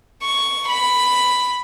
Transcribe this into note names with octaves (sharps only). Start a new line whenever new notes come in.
C#6
B5